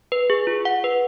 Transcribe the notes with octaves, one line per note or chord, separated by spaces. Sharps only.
B4
G#4
F4
F#5
B4